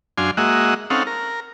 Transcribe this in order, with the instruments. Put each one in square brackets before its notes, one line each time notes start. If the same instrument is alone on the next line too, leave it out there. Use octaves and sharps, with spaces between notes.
[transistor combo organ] F#2 D4 F5 G#5 C6
G#3 A#3 F#4 D#5 E5 F#5
C4 C#4 D#4 A4 F5 F#5
A#4